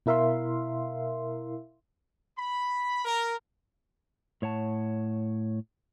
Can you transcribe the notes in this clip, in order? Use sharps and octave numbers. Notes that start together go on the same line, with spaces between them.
B2 E4 A#4 E5 F5 C6
B5
A#4
A2 C#5 F#5 A5